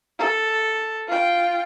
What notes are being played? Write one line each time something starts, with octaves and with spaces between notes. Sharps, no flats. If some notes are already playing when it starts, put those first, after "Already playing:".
A4
F4 G5